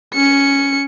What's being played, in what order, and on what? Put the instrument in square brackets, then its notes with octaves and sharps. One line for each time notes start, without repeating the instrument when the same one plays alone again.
[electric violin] C#4 C#7